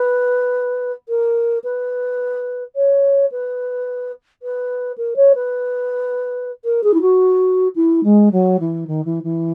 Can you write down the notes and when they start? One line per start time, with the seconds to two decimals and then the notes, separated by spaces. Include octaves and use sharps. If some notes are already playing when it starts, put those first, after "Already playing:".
Already playing: B4
1.09 A#4
1.64 B4
2.76 C#5
3.32 B4
4.43 B4
4.98 A#4
5.16 C#5
5.35 B4
6.64 A#4
6.84 G#4
6.94 E4
7.01 F#4
7.76 E4
8.04 G#3
8.32 F#3
8.60 E3
8.87 D#3
9.05 E3
9.24 E3